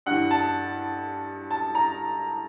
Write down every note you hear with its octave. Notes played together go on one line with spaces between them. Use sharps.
G2 E3 F#5
A5
A5
A#5